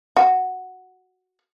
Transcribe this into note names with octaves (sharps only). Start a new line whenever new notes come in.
F#4